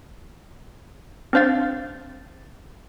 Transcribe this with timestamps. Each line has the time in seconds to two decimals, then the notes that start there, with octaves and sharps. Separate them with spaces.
1.33 C4 D4 C5 F5 A6